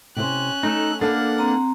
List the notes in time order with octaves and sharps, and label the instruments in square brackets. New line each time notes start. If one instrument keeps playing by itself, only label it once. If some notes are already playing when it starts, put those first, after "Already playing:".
[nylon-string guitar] C3 E4 C5 [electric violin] C#4 F#6
[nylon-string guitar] A3 [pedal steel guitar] D#4 A4
[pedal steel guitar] A#3 D4 [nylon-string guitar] A4 B4 F5 [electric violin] F#5
[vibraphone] C4 A#5